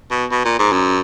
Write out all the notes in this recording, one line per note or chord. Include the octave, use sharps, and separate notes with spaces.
B2
B2
A#2
G#2
F#2